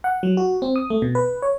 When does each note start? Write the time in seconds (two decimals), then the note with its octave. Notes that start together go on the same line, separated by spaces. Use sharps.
0.04 F#5
0.23 F#3
0.37 F#4
0.62 C4
0.76 D#6
0.90 A3
1.02 B2
1.15 B4
1.42 C#5